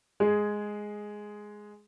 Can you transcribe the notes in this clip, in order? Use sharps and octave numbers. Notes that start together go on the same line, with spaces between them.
G#3 G#4